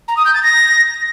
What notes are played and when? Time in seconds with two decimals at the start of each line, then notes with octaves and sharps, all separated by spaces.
0.08 A#5
0.17 D#6
0.26 G6
0.34 A6
0.43 A#6